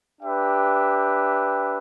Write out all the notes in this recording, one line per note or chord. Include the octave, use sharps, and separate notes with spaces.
D4 G4 B4 E5 G5